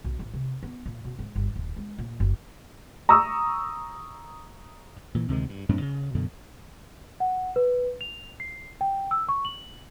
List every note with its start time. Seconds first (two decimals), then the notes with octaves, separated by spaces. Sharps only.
0.04 B1
0.19 A1
0.34 C3
0.63 B3
0.86 A#2
1.05 B2
1.19 G#2
1.35 G1
1.56 D#1
1.77 G#3
1.99 A#2
2.20 F#1
3.09 A#5 C#6 D#6 E6
5.15 A#2 E3
5.28 D2 C3 D#3 G#3
5.49 G2
5.69 F#2 A2 C4 D4
5.81 C#3
6.15 F#2 B2 D3
7.20 F#5
7.56 B4
8.01 F7
8.40 C7
8.81 G5
9.11 E6
9.29 C#6
9.45 F#7